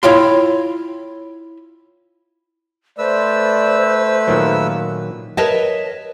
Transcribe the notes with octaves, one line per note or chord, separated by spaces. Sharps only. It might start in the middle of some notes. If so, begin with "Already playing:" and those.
E4 F4 C#5 F5 G5 C6
A3 B4 C5 D5 E6
A#2 D#3 F#3 A#3
A#4 B4 C#5 D#5 E5 A5